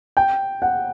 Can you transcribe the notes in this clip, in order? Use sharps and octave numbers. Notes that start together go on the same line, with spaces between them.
G5
F#5